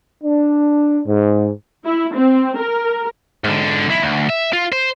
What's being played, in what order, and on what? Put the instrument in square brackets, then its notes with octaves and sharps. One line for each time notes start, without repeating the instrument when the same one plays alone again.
[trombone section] D4
G#2
[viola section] E4
C4
A#4
[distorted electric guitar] G#2 D3
B1 E4
D2
E5
F4
C5